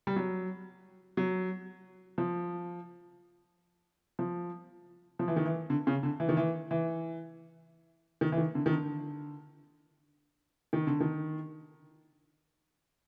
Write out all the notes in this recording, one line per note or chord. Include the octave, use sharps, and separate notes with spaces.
G3
F#3
F#3
F3
F3
F3
E3
D#3
E3
D3
C#3
D3
E3
D#3
E3
E3
D#3
E3
D#3
D3
D#3
D3
D#3
D3
D#3